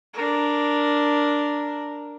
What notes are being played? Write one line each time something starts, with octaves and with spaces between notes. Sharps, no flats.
D4 A#4